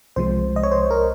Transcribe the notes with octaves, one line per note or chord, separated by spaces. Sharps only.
C2 C3 F3 G#3 C5
D#5
C#5
C5
A#4